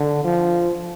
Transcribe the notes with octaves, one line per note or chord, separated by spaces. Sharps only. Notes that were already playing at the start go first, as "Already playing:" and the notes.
Already playing: D3
F3